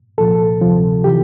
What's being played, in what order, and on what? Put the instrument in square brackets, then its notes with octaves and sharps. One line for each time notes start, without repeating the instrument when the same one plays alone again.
[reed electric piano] C2 A#2 F3 A4
D2 C3 F3
C3 E3 G4